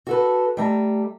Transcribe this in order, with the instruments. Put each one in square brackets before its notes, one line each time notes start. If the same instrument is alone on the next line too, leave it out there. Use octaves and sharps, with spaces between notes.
[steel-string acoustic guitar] F#4 A4 B4
G3 A3 A#5